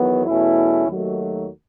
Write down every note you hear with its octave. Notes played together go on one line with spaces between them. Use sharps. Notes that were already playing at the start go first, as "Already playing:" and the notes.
Already playing: E2 D#3 F#3 B3
E2 B2 A3 C#4 E4
D#2 D#3 F#3 A3